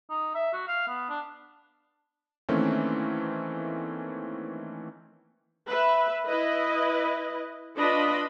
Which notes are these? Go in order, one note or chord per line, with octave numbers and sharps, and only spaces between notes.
D#4
E5
F#4
F5
B3
D4
D#3 E3 A3 A#3 C4 C#4
B4 E5
E4 B4 D#5
D4 F4 B4 D#5 B5